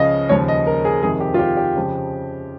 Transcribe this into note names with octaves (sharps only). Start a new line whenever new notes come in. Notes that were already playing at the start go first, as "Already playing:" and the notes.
Already playing: C#2 C#3 F3 D#5 F5
D#2 C#3 F3 C#5
D#5
A#4
G#4
F2 C3 D#3 G#4
G4
F4
G4
G4
F2 C#3 F3